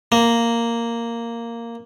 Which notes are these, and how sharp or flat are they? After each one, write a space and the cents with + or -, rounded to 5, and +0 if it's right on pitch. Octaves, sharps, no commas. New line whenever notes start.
A#3 -5